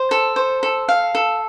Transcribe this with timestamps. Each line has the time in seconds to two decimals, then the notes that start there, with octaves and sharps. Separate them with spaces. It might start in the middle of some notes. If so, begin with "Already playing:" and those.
Already playing: C5
0.11 A4
0.36 C5
0.63 A4
0.89 F5
1.15 A4